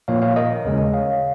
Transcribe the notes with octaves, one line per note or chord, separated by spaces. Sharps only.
A#2 F3 A#3 C#5 F5
C#5 F5
A#4 D#5
D#2 C#3 G#3 C#4
C#5 F5